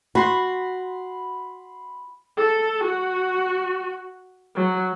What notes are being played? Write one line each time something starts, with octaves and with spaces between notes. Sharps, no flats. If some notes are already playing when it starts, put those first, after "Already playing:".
F#4 B5 C6
A4
F#4
F#3